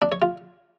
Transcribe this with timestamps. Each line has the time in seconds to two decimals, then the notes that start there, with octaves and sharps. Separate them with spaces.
0.02 D4
0.12 C#5
0.22 F4